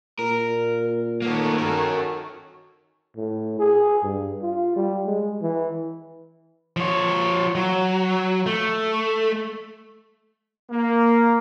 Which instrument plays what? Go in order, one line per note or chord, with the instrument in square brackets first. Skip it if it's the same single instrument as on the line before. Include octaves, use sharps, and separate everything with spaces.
[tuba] A#2 [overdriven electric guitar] A#4
[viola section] D#3 A4 C#5 [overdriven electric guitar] A#3 B3
[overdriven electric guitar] F#4 A#4
[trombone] A2
G#4
G2
F4
G3
G#3
E3
[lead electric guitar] F3 C#5
F#3
A3
[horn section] A#3